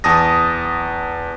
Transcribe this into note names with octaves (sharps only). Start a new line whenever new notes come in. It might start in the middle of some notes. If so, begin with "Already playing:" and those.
E2 A5 D#6 A#6